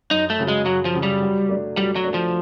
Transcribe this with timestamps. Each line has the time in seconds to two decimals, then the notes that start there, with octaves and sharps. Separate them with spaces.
0.11 F#2 D#4
0.30 A3
0.39 C#3 F#3
0.48 G#3
0.66 F#2 F#3
0.85 F3
0.94 C#3 F#3
1.03 G3
1.22 F#3
1.49 A3 D4
1.77 F#3 G3
1.96 F#3
2.04 A3 D4
2.14 F3